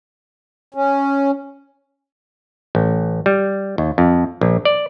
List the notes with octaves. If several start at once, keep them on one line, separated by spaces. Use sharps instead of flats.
C#4
A1
G3
D#2
F2
A#1
D5